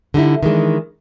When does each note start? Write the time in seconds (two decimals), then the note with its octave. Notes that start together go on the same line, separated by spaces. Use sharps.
0.14 D3 G3 D#4 E4
0.43 D#3 E3 G#3 D4